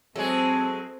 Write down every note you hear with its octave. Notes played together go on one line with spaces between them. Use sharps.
F#3 G#3 C4 G#4 A4